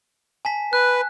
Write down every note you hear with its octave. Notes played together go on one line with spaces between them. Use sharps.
G#5 A5 B6
B4 F#6